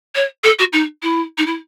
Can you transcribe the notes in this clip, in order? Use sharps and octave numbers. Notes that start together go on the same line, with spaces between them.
C#5
A4
F#4
D#4
E4
D#4
E4